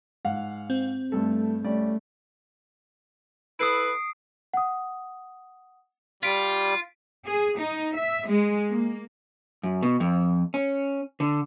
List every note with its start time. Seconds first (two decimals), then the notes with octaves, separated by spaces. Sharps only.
0.25 G#2 F5 F#5
0.70 C4
1.12 G2 A3 A4
1.64 G3 A3 C#4 D5
3.59 E4 A4 B4 D#6 C7 D7
4.54 F#5 D#6
6.23 G3 F4 B6 D7
7.26 G#4
7.58 D#4
7.97 E5
8.28 G#3
8.71 A#3
9.63 F#2
9.82 B2
10.00 F2
10.54 C#4
11.20 D3